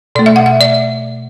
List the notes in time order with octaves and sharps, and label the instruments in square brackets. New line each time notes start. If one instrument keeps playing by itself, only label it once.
[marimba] B2 D5
A3
E5
F#5
E5
D5